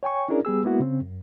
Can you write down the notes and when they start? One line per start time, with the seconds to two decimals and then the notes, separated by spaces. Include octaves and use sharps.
0.03 C#5 G5 G#5 C#6
0.28 C#4 D4 E4 G#4 A#4 D5
0.45 G3 B3 G#4 E6
0.63 G#3 A#3 B3 E4 F#4
0.80 C#3 C4
1.01 F#2